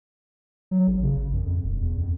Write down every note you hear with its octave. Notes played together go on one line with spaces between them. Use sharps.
F#3
A1
C#3
A1
F#2
F2
E1
E2
F2